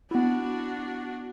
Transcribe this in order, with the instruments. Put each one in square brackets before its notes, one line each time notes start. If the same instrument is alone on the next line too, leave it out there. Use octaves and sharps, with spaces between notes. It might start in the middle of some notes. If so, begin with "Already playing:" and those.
[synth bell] B3 E4 [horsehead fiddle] D4 F#4